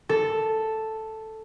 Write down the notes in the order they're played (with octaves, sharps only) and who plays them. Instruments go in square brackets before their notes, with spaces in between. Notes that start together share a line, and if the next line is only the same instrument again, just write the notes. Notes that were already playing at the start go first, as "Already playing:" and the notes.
[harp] A4